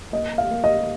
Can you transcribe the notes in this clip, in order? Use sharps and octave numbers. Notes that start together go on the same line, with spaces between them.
A#3 D#5
F5
A#3
D#5